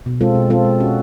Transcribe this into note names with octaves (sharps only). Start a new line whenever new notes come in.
B2
G#3 C4 F4 A4
B2
G#3 C4 F4 A4
G#3
C#4 F#4